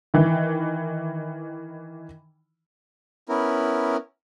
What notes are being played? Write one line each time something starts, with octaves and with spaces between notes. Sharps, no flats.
D#3 E3
B3 C#4 E4 A#4